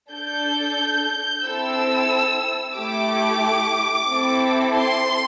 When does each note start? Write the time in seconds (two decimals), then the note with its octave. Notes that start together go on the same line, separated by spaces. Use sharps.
0.11 D4 A4 G6
1.44 C4 E4 A4 E6
2.77 A3 E4 G4 D6
4.10 C4 E4 A4
4.76 C6